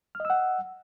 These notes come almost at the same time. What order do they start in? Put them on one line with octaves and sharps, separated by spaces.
F6 D#5 E6 F#5